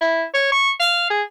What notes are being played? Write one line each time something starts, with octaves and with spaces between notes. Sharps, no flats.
E4
C#5
C#6
F5
G#4